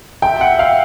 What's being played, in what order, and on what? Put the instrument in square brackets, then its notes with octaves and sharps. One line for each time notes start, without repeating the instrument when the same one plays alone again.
[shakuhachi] E5 [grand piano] G5
[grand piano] F#5
F5